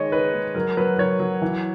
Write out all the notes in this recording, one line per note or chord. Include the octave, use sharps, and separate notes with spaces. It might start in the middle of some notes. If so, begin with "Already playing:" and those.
Already playing: D#3 G#3 C#5 D#5
D#4 B4
G#3
F#3 A#4
F#3 B4
F#3 C#5
F#3
E3